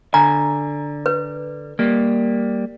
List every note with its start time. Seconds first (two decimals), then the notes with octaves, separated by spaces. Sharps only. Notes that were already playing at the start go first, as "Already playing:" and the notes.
0.14 D3 G#5 A#5
1.06 B4
1.79 G3 A#3